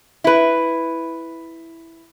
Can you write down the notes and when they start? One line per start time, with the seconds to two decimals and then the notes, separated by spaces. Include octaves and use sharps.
0.24 E4 B4